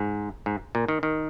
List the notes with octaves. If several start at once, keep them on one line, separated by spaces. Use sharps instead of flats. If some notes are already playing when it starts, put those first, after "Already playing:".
Already playing: G#2
G#2
A#2
D#3
D#3